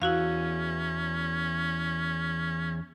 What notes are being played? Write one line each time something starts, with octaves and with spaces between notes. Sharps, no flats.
E2 C#4 E4 F#4 F5